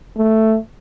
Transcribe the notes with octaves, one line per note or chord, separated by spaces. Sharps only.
A3